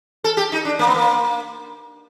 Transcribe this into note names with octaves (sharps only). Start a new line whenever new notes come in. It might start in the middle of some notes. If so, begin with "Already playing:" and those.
A4
G4
D#4
D4
A#3
B3
A#3